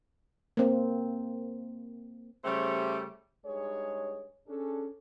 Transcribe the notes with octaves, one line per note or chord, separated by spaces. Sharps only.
A#3 C4
C#3 G3 A3 G4 C5 C#5
G2 G#3 D#4 G#4 C#5
C#4 D4 G#4 A4